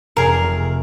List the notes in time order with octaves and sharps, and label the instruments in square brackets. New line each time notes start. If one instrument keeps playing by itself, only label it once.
[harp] F1 [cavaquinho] G#4 A#4